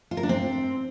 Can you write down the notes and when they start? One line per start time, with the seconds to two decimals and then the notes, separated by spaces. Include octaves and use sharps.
0.11 F4
0.17 A#4
0.23 D4
0.29 C4